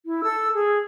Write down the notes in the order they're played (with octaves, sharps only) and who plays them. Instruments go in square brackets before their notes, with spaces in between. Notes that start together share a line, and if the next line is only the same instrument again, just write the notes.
[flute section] E4
A4 E6
G#4